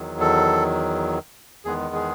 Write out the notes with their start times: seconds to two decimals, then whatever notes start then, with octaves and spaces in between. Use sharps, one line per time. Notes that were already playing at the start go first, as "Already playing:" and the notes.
Already playing: E2 D#3 F#3
0.20 A4
1.65 E2 D#3 G#3 B3 G#4
1.95 G#4